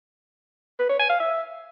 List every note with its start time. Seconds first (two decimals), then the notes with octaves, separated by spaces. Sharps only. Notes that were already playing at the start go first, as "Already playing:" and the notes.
0.79 B4
0.89 C#5
0.99 G#5
1.10 F5
1.20 E5